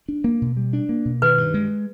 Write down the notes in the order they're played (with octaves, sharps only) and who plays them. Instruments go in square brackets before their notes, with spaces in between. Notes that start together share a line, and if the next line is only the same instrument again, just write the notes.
[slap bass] D4
A#3
B2
G3
D4
A#3
B2
[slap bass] D#3 [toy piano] B4
[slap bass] G2
G#3